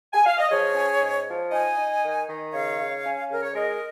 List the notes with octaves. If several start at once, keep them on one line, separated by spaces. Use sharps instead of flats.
G#5
F5
D#5
F3 G#4 C#5
C#4
G#2
F3
D#4 D#5 G#5
D#4
D#3
D#3
C#3 C#5 F5
C#3
C#4
C#3 A#4
C#5
G#3 A#4 D#5